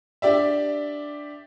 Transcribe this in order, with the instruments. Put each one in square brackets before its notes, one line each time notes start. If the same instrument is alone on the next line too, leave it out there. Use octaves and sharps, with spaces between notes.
[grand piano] D4 G4 D5 E5